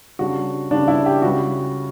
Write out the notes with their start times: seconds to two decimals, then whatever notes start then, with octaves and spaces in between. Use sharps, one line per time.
0.19 C#3 G3 D4 F#4
0.71 C#3 G3 D4
0.88 E4
1.06 G4
1.22 C#2 C#3 G3 F#4